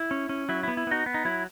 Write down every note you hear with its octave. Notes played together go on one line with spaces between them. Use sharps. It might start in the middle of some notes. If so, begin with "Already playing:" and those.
Already playing: E4
C#4
C#4
F#3 E4
B3 E4
E4
B3 D#4 F#4
B3
D#4
F#3 E4